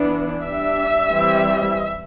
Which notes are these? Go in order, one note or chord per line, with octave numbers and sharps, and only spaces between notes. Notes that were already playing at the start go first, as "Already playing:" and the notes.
Already playing: E3 B3 D4
G3 D4 E5
E3 G3 C4